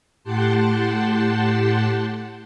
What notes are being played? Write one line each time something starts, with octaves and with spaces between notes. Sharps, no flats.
A2 G4 F#5 G5 A5 C6